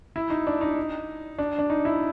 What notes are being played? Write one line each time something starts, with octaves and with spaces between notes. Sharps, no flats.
E4
D#4
D4
D#4
D4
D4
D#4
E4